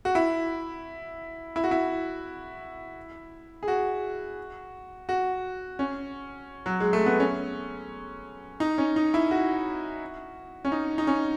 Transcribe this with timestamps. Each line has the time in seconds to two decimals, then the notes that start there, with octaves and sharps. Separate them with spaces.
0.05 F#4
0.15 E4
1.56 E4
1.64 F#4
1.71 E4
3.63 G#4
3.68 F#4
5.09 F#4
5.79 C#4
6.66 F#3
6.80 G#3
6.93 A3
7.06 B3
7.20 C#4
8.60 D#4
8.78 C#4
8.96 D#4
9.14 E4
9.31 F#4
10.65 C#4
10.72 D#4
10.98 D#4
11.07 C#4